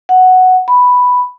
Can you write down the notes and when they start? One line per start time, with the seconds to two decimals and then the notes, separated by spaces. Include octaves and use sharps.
0.09 F#5
0.68 B5